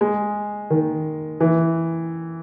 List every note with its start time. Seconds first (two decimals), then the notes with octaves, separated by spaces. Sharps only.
0.01 G#3
0.70 D#3
1.40 E3